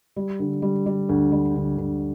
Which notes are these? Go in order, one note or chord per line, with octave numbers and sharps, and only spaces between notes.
G3
D3
G3
G3
D2
G3
D2
D2